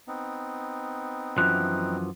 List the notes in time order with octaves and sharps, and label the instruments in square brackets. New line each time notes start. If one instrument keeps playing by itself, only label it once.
[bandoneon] B3 C4 D#4
[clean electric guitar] F#2 E3 F3 [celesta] F#6